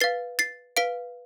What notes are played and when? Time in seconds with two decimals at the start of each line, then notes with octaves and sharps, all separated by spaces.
0.01 B4 F5 A6 C7
0.39 A6 C7
0.77 B4 F5 B6 D7